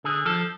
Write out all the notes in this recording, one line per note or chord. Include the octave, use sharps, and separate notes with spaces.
D3 G#4
F3 A4